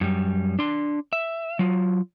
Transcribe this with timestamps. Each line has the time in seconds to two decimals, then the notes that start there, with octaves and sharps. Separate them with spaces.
0.01 F#2 G3
0.59 D4 C6
1.13 E5
1.59 F#3 F4